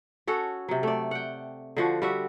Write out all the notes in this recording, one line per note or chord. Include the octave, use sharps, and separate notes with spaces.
C#4 F#4 A4
C3 F#3
A3 D5
F#5 G5
D3 F3 F#4
G3 F#4 E5